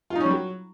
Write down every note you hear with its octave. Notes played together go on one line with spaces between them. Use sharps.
F4
D#4
C#4
G3
F#3